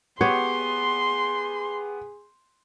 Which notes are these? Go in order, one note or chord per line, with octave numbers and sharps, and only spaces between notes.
B3 G4 G#4 C#5 C6